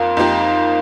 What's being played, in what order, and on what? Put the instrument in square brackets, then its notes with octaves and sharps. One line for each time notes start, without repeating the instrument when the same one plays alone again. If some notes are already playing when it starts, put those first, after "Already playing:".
Already playing: [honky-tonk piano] F2 A#3 A#4 [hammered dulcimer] F4
[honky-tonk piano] F2 F3 A#3 G4 A#4 [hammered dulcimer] D#4